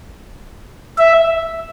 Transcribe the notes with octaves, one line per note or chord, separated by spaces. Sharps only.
E5